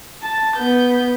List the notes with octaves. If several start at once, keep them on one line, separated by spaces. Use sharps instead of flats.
A5
B3 G6